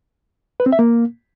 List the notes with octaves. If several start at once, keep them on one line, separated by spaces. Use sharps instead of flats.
B4
C4
E5
A#3